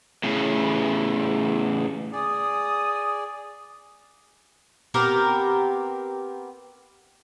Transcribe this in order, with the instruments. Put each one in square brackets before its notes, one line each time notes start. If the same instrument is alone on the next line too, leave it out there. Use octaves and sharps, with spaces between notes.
[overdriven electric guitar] A2 C#3
[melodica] G#4 D5 [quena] D#6
[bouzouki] B3 C4 G4 A#4